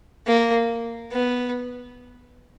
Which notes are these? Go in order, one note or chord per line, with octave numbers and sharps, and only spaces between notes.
A#3
B3